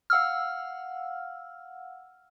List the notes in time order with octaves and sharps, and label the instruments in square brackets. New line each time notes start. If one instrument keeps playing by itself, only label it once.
[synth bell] F5 F#5 E6 F6